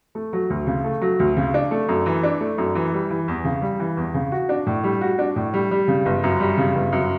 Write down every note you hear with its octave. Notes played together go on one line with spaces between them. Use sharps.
A3
F#3
D2
C#3
A3
F#3
D2
C#3
D4
A3
F#2
E3
D4
A3
F#2
E3
G3
E3
E2
C#3
G3
E3
E2
C#3
F#4
D4
A2
G3
F#4
D4
A2
G3
G3
C#3
G1
F#2
G3
C#3
G1
F#2